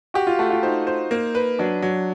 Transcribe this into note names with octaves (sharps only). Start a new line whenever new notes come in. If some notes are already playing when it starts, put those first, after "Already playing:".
F#4 G4
F4
A3 F#4
F4
D#4 C5
C5
A#3
B4
F#3 D4
F#3